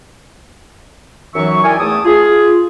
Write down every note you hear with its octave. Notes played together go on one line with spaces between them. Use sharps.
F#2 E3 F#3 D#4 E5 C#6
E4 A#4 D5 G5 G#5
E2 A3 A5 D6 D#6
F4 G#4